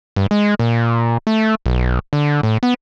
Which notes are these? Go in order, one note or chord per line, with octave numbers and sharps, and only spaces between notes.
G2
G#3
A#2
A3
B1
D3
A2
B3